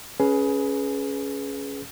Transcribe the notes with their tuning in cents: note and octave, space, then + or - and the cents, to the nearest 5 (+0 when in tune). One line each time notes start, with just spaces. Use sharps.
C#4 +0 G#4 +20 B4 -5